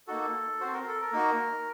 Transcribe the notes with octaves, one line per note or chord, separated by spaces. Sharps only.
A#3 D#4 F#4 A4
C4 F#4 C5
A#4
A4
A#4
A#3 D#4 F#4